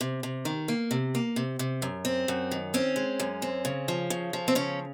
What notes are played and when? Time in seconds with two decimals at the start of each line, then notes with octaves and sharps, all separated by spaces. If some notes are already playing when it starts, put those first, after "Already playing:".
0.01 C3
0.23 C3
0.45 D#3
0.68 A#3
0.91 C3
1.15 A#3
1.36 C3
1.59 C3
1.82 F#2
2.05 C4
2.28 F#2
2.51 D#3
2.74 C4 C#4
2.96 G#3
3.20 F#2
3.42 C4
3.65 C#3
3.88 F3
4.10 C#3
4.33 F3
4.48 C4
4.55 C#3 C#4